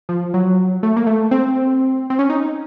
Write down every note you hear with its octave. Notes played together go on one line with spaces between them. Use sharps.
F3
F#3
A3
A#3
A3
C4
C4
C#4
D#4